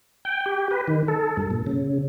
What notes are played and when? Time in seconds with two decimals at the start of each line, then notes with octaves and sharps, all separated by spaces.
0.25 G5
0.46 G4
0.71 B4
0.88 D#3
1.08 A4
1.37 G2
1.50 A#2
1.67 C#3